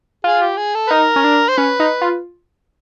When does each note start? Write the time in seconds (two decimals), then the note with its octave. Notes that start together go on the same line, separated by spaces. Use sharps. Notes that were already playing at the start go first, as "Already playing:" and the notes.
0.24 F4 G#4
0.41 G4
0.57 G#4
0.75 A4
0.87 B4
0.90 D#4 A#4
1.16 C#4
1.24 D4
1.49 C5
1.58 C#4 B4
1.80 D#4
2.01 F4